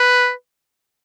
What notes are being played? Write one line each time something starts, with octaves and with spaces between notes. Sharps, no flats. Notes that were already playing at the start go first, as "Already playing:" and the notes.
Already playing: B4